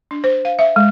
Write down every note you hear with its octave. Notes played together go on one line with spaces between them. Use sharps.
D4
C5
F5
E5
G#3